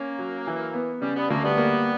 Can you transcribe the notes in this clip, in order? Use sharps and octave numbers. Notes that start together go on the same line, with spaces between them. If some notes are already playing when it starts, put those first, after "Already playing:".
Already playing: A#3 C#4
F#3
E3
B3
C#3 G3
G3 B3
D2 A#3
G3 B3
A#3